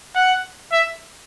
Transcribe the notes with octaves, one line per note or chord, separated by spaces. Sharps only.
F#5
E5